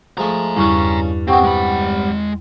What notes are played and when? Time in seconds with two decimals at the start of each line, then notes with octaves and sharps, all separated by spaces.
0.18 F3 G#3 A3 G#5 A#5
0.57 E2 G2 C#3 G3 C#4 E4 C#6
1.28 C3 B3 C4 F#5 G5 C#6
1.44 G#3 B5